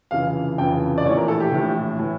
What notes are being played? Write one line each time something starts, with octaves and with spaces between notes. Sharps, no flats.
F1 F2 C#3 E3 F5
F1 F2 C#3 E3 G5
D5
A#1 A2 E3 C#5
A#4
A4
G4
A#1 A2 E3
A2 E3